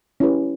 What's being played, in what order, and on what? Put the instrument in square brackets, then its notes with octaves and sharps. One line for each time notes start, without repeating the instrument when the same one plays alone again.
[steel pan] C#4 E4 G4 B4